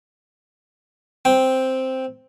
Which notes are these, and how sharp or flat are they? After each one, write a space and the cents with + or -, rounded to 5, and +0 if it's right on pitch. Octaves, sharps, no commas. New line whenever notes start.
C4 +0 G5 +0